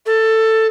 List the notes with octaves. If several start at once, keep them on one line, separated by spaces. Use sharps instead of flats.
A4